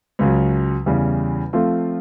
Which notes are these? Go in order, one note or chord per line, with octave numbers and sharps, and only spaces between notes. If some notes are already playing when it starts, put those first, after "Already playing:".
C#2 C#3 F#3
E2 C#3 E3 G3
F3 A3 C4 F4